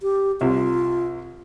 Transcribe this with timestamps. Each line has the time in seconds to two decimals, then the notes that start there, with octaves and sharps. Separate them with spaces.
0.02 G4
0.41 C2 C3 F4